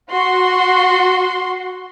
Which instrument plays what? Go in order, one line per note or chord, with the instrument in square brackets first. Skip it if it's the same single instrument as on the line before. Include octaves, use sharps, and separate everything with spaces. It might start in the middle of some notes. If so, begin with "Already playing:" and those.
[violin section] F#4 [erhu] C6